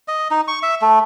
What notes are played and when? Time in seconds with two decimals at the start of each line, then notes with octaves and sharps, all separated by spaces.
0.08 D#5
0.31 D#4
0.48 C#6
0.63 E5
0.82 A3